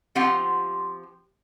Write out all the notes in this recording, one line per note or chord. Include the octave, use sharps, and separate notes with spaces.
F3 C4 F4 G4 F#5